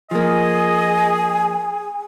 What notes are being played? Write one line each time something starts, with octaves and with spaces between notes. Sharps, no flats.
F3 A#3 G#4 D#5 G#5